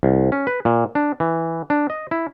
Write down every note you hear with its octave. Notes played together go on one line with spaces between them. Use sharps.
C2
C#4
B4
A#2
D4
E3
D4
D#5
E4